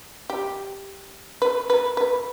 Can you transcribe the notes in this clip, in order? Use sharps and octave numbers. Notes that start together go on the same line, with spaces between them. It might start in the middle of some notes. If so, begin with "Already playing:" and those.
G4
B4
B4
B4